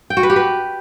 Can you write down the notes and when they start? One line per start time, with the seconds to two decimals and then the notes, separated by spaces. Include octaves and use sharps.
0.10 G5
0.17 F#4
0.23 B4
0.30 G4
0.36 B4